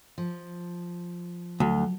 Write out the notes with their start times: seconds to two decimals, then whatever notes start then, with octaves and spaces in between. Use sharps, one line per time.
0.18 F3
1.60 D2 F#3